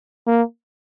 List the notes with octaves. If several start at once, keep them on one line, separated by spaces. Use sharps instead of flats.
A#3